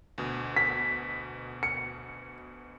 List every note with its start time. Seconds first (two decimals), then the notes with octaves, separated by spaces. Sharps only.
0.18 D2 B2
0.56 B6
1.63 C#7